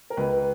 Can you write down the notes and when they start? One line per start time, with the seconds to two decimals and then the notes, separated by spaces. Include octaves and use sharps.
0.10 A#4
0.17 C#2 B4